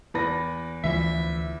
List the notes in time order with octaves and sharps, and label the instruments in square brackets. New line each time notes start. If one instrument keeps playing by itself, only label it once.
[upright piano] E2 B4 A#6
[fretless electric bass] D2 E3 F3 [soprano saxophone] E5